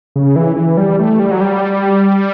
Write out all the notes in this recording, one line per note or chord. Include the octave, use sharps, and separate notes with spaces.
C#3
E3
E3
G3
A3
G3
F#3
G3